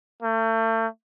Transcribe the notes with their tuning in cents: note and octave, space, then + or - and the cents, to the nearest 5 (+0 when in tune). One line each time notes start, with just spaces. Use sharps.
A3 +40